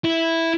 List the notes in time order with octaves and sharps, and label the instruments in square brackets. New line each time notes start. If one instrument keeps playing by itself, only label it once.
[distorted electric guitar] E4